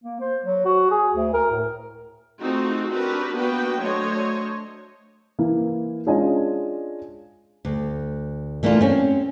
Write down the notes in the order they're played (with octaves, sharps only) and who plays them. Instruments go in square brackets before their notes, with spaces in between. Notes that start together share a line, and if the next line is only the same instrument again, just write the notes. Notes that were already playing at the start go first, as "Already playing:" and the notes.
[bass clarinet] A#3
C5
F#3
F#4
G#4
D2
A#4
A2
[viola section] A3 C4 D#4 F4 F#4 G#4
C4 D4 F#4 G4 A#4 B4
A#3 B3 D4 F#4 B4 G5
F#3 A3 D4 C5 C#5 D#5
[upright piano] E3 A#3 E4
G#3 C#4 D4 F4 D#5 G#5
[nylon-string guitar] D2
E3 A3 A#3 D4 F4
C4 C#4